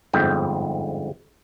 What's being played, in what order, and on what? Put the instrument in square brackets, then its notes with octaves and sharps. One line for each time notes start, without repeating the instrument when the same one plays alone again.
[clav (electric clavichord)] G1 F2 G#2 G5